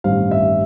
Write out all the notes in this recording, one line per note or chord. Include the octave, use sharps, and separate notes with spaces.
A1 G2 D#3 G3 C4 F5
E5